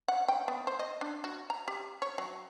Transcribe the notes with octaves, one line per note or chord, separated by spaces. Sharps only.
F#5
G5
B3
C5
D#5
D4
F#4
A#5
G4
C#5
F#3